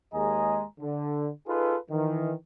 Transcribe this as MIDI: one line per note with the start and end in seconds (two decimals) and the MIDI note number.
0.14 0.64 39
0.14 0.64 56
0.14 0.64 68
0.14 0.64 75
0.14 0.64 80
0.14 0.64 82
0.80 1.29 50
1.48 1.76 63
1.48 1.76 65
1.48 1.76 68
1.48 1.76 69
1.48 1.76 71
1.91 2.33 51
1.91 2.33 52